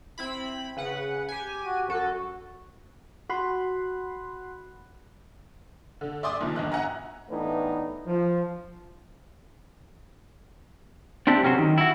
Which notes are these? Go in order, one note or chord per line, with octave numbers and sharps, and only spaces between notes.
C4 E4 B5
C#3 B4 F#5
G4 G#5
F#4
F#2 F#4 A4
F#4 B5 C6 F#6
D3
D5 E5 C6 D6 D#6
A#1 A#2 D#3 F3
G1 E2 D#5 F#6
E5 F#5 G#5 A#5
A2 E3 B3 D4 D#4
F3
C4 D4 E4 G4
B1 C3 C#4 F#4 C5
D#3
E4 F#4